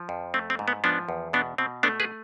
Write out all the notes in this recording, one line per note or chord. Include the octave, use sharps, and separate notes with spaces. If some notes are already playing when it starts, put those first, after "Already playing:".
Already playing: F3
F2
A3 C4
C4
G#2
B3
F3 B3 D4
E2
B2 B3 D4
B2 C4
A3 B3 D4
G#4 B4